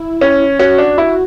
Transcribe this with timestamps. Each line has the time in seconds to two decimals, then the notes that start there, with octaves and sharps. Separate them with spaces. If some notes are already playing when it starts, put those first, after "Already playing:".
Already playing: E4
0.21 C#4
0.59 C#4 F#4
0.78 D4
0.98 E4